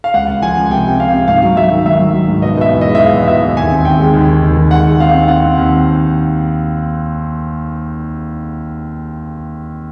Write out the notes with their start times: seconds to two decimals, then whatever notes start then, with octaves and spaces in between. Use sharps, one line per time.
0.04 F5
0.14 C#2 F#5
0.28 C#2
0.42 F3 G#5
0.57 C#2
0.71 C3 G5
0.85 C3
0.99 C3 F5
1.14 C3
1.28 G#2 F5
1.43 F#3
1.56 F#3 E5
1.72 D#3
1.86 G#2 E5
2.00 F#3
2.13 F#3
2.28 G#2
2.42 B2 D#5
2.57 B2 E5
2.72 E2
2.81 D#5
2.85 G#3
2.95 E5
3.00 G#3 F5
3.14 E2
3.28 B2 E5
3.42 E2
3.57 D#2 G#5
3.72 C4
3.85 D#3 G5
4.00 G#3
4.13 D#2
4.28 D#3
4.43 D#2
4.57 D#2
4.71 G#3 F#5
4.85 G#3
5.00 C4 F5
5.15 C4
5.28 C4 F#5
5.43 C4
5.57 D#2